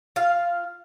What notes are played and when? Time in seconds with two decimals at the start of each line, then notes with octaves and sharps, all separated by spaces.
0.16 F4 F5